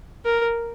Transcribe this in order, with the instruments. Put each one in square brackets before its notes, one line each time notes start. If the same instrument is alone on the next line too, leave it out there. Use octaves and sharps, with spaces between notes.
[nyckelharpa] A#4